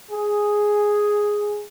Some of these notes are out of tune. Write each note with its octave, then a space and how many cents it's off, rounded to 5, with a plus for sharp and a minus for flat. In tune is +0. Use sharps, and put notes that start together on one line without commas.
G#4 +0